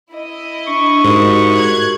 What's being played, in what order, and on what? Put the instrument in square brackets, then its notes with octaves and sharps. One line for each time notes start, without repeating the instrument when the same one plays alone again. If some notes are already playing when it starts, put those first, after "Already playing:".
[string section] E4 D#5
[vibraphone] D4 [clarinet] C#6
[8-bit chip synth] G#2 [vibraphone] F#4 G4 A#4
[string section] F#6 G#6